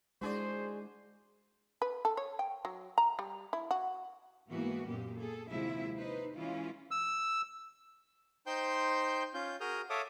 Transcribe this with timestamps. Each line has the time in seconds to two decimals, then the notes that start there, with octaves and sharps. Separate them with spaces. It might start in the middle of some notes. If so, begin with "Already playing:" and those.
0.22 G#3 D4 E4 F#4 G#4 C5 D5
1.82 B4
2.05 A4
2.17 C#5
2.39 G5
2.65 F#3
2.98 A#5
3.19 G3
3.53 E4
3.71 F#4
4.49 G#2 E3 A#3 B3 F#4
4.87 F#2 A#2 G4
5.19 G#4 A4
5.49 D#2 C3 F3 G#3 E4 E5
5.98 D#4 B4 C5
6.36 E3 G#3 C#4 E4 F4
6.91 E6
8.47 D#4 C5 G5 C6 G6
9.34 C#4 F4 G6
9.60 F#4 G#4 A#4 D#6 F6 G6
9.90 A4 C#5 E5 F5 D6 D#6